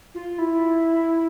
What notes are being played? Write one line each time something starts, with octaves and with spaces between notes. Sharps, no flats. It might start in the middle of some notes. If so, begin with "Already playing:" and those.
F4
E4